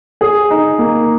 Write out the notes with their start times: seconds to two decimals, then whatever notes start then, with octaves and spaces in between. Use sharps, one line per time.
0.21 G#4
0.50 D#4
0.79 A#3